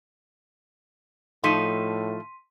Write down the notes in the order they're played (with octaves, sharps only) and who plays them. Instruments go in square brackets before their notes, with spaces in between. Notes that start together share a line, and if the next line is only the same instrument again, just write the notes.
[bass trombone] A2 [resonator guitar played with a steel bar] F3 A3 D#4 [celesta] C6 B6 D#7